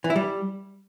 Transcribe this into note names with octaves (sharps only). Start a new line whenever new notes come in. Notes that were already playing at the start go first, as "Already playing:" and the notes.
E3
E4
G3